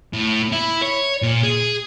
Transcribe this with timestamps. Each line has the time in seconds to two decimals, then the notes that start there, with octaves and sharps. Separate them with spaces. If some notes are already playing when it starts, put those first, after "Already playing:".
0.13 A2
0.52 E4
0.82 C#5
1.22 A#2
1.43 G#4